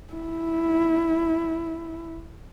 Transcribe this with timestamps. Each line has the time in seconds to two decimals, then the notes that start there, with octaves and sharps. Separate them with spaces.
0.13 E4